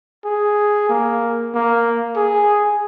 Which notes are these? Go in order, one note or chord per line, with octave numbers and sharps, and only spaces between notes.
G#4
A#3
A#3
G#4